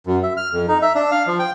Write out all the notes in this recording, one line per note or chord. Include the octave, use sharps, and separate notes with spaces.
F#2
E5
F6
F2
D#4
E5
D4
F5
F3
G5